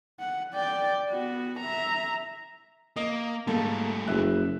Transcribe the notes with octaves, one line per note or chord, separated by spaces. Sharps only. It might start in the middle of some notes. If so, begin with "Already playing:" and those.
F#5
D5 G5
B3 F#4
E5 A#5
A#3 D#5
G#2 G3 A3 A#3 A4
F#1 E5 F#6